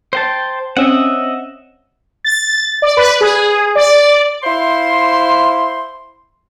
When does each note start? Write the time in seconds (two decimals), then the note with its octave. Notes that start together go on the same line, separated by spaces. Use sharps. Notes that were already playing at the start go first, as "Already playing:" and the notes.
0.13 C5 G5 A5
0.77 C4 C#4 D#5 E5 F#5
2.24 A6
2.82 D5
2.97 B4
3.21 G#4
3.75 D5
4.44 E4 C5 F5 C6